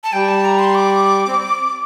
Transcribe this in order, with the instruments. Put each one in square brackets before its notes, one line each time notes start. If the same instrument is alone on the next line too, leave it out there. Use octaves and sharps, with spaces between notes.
[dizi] A5
[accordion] G3 [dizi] G5
[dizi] A5
A#5
C6
D6
[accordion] C4